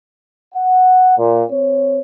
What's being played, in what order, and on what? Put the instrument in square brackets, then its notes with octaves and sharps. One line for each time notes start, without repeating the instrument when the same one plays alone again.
[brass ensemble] F#5
A#2
C4 C#5